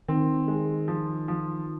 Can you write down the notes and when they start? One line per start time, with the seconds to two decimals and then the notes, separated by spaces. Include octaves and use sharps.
0.08 D#3 C4
0.48 G#3
0.88 F3
1.28 F3